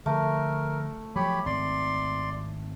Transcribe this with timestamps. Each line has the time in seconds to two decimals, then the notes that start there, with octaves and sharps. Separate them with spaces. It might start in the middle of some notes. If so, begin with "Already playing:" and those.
0.06 D3 F3 A3 A#4
1.16 F3 F#3 G4 C#5 B5
1.46 G#1 C4 D5 C6